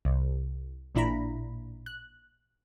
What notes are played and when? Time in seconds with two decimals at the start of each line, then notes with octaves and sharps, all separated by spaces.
0.05 C2
0.95 A1 A#2 D4 E4 A#5 B5
1.86 F#6